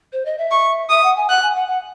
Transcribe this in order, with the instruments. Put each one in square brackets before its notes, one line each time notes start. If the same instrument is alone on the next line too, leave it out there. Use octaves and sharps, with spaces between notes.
[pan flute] C5
D#5
E5
[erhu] C#6
[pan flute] E5 [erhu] D#6
[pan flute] F#5
G#5
[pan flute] F#5 [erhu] F#6
[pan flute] G#5
F#5
F#5